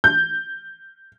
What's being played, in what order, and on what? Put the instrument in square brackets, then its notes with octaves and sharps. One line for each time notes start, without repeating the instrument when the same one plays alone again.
[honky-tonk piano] G6